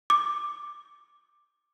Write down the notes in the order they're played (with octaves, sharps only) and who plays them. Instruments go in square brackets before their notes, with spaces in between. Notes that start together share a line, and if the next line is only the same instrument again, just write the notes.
[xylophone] D6